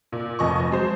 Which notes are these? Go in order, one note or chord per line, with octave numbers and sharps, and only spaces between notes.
A#2
F1 F2 D#5 C#6
F#3 G#3 C5